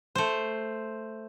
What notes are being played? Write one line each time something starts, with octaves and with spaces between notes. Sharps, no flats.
A3 C5